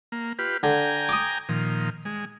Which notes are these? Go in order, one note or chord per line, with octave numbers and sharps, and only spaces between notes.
A#3
F4 G4 B4
D3 G5 G#5 A#5
D6 D#6
A#2 D#3 F3
G#3